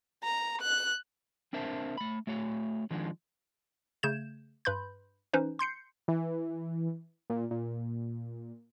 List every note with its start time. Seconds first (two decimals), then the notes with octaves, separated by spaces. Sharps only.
0.24 A#5
0.62 F#6
1.53 C4 D4 A#4 C5 E5 A5
1.97 A3 B5
2.27 A3 F#4 C#5
2.91 D#3 F3 G#3 D4
4.03 C#3 A3 G6 G#6 E7
4.65 G2 B4 B5 C6 G6
5.33 E3 C#4 D#4 B4 C5
5.59 C6 G6 C7 C#7
6.08 E3
7.30 A#2
7.51 A#2